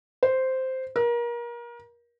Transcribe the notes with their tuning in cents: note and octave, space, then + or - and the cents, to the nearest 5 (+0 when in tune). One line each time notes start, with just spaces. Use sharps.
C5 -5
A#4 +30